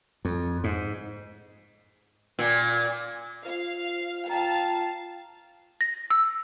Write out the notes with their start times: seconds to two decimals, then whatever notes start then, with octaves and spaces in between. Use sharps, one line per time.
0.25 F2
0.64 G#2
2.39 A#2
3.46 F4 C5 F5
4.29 F4 F5 G5 A5 A#5
5.81 A#6
6.10 E6